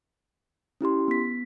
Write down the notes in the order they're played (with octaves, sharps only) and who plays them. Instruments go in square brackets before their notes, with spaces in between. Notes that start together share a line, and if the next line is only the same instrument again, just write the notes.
[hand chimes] C#4 E4 G4 C6
B3 B6